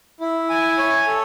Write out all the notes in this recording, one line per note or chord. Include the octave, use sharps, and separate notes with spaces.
E4
G#5
C#5
A4